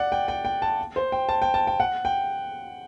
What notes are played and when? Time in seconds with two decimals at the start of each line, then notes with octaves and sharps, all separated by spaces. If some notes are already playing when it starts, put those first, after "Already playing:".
Already playing: D5 F#5
0.12 G5
0.28 G5
0.45 G5
0.62 A5
0.96 C5
1.12 G5
1.29 A5
1.42 G5
1.54 A5
1.67 G5
1.80 F#5
2.05 G5